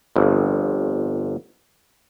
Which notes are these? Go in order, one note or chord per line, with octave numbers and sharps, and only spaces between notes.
G1 F2